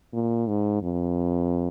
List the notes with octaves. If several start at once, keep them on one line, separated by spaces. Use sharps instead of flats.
A#2
G#2
F2